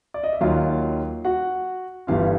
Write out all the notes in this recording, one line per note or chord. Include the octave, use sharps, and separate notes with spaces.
D5
D#5
E5
D#2 D#3 F#3 F4 F5
F#4 F#5
G1 G2 E3 F4 F5